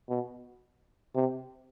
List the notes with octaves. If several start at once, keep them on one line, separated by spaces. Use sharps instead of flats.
B2
C3